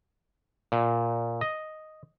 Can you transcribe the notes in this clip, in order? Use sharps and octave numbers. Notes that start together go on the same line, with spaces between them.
A#2
D#5